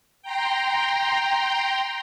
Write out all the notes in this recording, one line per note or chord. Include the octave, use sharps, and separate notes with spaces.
G5 A#5 C6